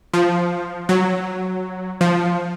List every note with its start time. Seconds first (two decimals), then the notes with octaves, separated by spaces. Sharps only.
0.14 F3
0.89 F#3
2.01 F3